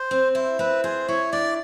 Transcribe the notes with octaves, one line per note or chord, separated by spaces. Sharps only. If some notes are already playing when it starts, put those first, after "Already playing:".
Already playing: C5
C4
E4 C5
C4 B4
G#4 C5
E4 C#5
D4 D5